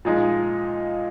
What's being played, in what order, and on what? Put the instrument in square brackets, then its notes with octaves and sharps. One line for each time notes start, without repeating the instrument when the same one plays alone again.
[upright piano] A#2 F3 G#3 D#4